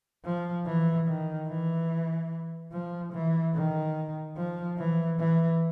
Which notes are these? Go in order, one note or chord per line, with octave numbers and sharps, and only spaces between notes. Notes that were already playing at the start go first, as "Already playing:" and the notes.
F3
E3
D#3
E3
F3
E3
D#3
F3
E3
E3